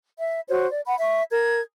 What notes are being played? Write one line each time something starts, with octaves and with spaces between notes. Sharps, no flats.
E5
F#4 C5 C#5
D5
F#5 B5
E5 C#6
A#4 G#6